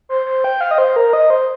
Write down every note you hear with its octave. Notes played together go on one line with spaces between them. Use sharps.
C5
C5
G5
F5
D#5
C5
A#4
D#5
C5